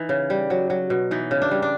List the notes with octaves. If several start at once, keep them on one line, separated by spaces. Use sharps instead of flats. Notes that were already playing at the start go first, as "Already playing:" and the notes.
Already playing: E3 D#4
C#3
G3
F#3
F#3
B2
E3 D#4
C#3
D4
G3
D4